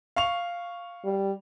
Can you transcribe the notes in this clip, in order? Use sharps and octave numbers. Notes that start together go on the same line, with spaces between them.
F5 C#6 F7
G3